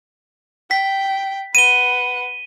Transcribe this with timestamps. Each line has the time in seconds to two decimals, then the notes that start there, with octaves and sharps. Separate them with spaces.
0.71 G5 B6
1.55 B4 F#5 D#7 G7